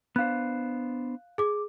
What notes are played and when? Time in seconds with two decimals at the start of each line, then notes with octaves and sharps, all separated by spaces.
0.16 B3 D4 C5 F5 F#6
1.38 G#4 D6